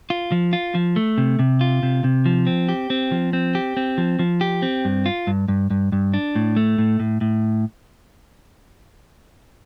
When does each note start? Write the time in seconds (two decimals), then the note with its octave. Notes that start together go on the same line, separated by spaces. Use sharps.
0.10 F4
0.32 F3
0.53 F4
0.75 F3
0.96 A3
1.18 C3
1.39 C3
1.61 F4
1.83 C3
2.04 C3
2.26 F3
2.47 C4
2.69 G4
2.90 C4
3.12 F3
3.33 C4
3.55 G4
3.77 C4
3.98 F3
4.19 F3
4.41 G4
4.62 C4
4.85 G2
5.06 F4
5.27 G2
5.48 G2
5.70 G2
5.92 G2
6.14 D4
6.36 A2
6.56 A3
6.78 A2
7.00 A2
7.21 A2